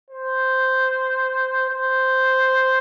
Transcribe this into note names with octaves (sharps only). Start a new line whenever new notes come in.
C5
C5